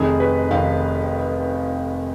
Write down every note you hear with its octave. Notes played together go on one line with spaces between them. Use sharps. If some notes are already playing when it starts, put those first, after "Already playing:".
Already playing: F1 F2 D#3 G#4
B4
F1 F2 D#3 F5